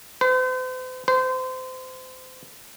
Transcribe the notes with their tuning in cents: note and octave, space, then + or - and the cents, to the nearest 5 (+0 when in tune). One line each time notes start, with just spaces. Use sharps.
C5 -45
C5 -30